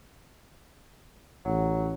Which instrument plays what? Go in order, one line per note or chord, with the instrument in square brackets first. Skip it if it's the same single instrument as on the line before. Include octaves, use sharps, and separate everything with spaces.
[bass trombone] A1 [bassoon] F#3